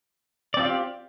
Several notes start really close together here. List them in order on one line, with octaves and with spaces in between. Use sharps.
D5 C4 F4 G4